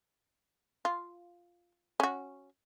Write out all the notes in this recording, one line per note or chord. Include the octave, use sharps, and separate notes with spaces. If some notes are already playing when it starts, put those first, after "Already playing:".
F4
C#4 F#4